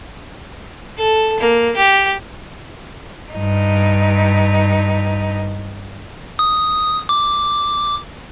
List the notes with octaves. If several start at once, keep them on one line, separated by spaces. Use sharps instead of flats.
A4
A#3
G4
G2 D#4
D#6
D6